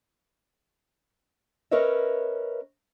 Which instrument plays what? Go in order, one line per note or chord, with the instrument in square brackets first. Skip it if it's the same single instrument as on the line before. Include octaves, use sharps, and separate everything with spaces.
[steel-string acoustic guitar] C#4 A#4 B4 C#5 D#5 E5